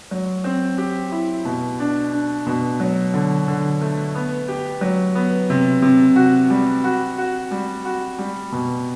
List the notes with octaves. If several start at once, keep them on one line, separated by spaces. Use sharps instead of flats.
F#3
C4
G4
E4
B2
D4
D4
B2
F#3
D3
D3
A3
B3
G4
F#3
B3
C3
C3
F#4
G3
F#4
F#4
G3
F#4
G3
B2